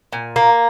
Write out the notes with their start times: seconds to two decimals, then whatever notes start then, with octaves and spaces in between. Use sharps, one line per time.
0.13 A#2
0.36 A#3